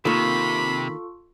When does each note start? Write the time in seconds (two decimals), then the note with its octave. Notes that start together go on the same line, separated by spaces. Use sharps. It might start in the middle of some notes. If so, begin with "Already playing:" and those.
0.05 C3 D#3 A#3 F4 A4 B5 C#6